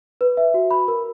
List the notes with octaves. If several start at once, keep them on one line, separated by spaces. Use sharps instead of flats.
B4
E5
F#4
B5
A#4